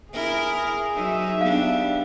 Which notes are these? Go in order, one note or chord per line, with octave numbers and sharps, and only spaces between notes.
E4 G#4 A#4
F#3 D#4 E5
G3 B3 D4 F5